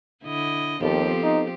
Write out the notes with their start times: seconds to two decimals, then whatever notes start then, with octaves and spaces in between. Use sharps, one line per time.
0.23 D3 E4 D#5
0.80 D#2 F3 B3 C4 G4 A4
1.23 D#4